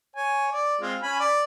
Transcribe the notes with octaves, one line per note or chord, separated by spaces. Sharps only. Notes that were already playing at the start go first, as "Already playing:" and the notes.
C#5 G#5
D5
G#3 C4 F4
C#4 G#5 B5
D5